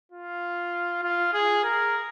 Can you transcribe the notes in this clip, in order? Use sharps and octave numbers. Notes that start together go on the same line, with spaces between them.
F4
F4
G#4
A#4